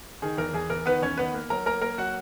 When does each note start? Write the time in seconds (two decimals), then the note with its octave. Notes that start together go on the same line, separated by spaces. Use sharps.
0.22 D#3 G#4
0.38 E2 A#4
0.54 E2 G#4
0.70 E2 A#4
0.86 D#3 B3 B4
1.02 E2 C#4 C#5
1.18 D#3 B3 B4
1.34 A#3
1.50 F#3 A#4 A#5
1.66 A#3 A#4 A#5
1.81 A#3 A#4 A#5
1.98 F#3 F#4 F#5